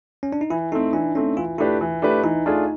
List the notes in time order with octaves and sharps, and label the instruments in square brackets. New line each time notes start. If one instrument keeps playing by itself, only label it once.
[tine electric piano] C#4
D4
D#4
[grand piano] E3 [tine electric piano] E4
[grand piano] A3 C4 [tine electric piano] D#4
[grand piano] E3 [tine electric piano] D4
[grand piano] A3 C4 [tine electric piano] C#4
[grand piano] E3 [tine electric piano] F4
[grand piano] A3 D4 G4 B4 [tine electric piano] E4
[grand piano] E3
A3 D4 G4 B4
[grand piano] E3 [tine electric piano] D#4
[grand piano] A3 D4 F4 G#4